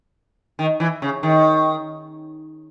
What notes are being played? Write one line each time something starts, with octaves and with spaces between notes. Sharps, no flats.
D#3
E3
C#3
D#3